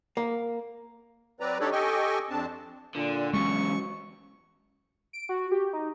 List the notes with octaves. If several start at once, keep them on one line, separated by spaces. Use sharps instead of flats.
A#3
F#3 C4 B4 D5 A#5
D4 D#4 G4 A4 C#5 D5
G4 A4 D#5 G5 G#5 C#6
F2 C4 D4 A5
A#2 D3
E2 F#3 G#3 C#4 C#6
D7
F#4
G4
D#4